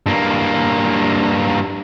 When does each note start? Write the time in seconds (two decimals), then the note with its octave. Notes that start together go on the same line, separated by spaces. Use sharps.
0.06 G2 A#3